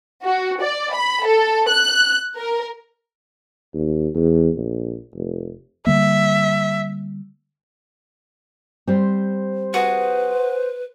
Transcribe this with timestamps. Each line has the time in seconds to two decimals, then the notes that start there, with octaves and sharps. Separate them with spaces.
0.25 F#4
0.60 D5
0.94 B5
1.25 A4
1.69 F#6
2.37 A#4
3.74 D#2
4.15 E2
4.56 A#1
5.15 F1
5.87 D3 G3 A#3 E5
8.87 G3 C4 C5
9.74 F#4 G#4 B4